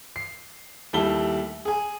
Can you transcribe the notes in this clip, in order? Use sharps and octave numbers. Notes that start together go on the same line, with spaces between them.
C7
D#2 G3 A3 E4 A5 G7
G#4 G#5